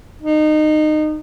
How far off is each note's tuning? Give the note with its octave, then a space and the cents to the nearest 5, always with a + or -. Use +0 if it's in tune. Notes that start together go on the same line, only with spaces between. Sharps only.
D#4 -25